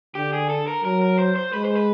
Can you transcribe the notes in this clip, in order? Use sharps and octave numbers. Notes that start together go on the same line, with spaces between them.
D3 G4
G#4
A4
A#4
F#3 A#4
A#4
C5
C5
G#3 B4
C5
B4